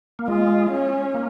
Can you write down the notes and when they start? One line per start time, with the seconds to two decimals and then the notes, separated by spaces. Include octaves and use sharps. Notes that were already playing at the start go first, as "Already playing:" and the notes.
0.19 A#3
0.28 G#3 F4
0.72 C#4
1.14 A#3